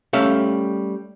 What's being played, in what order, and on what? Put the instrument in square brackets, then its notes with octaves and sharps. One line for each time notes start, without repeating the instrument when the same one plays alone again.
[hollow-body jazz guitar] G3 A3 C#4 A4 E5 F5